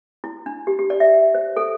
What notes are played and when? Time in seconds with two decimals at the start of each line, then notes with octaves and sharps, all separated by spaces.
0.24 E4
0.46 D4
0.67 G4
0.79 G4
0.90 D5
1.00 E5
1.35 C5
1.57 A4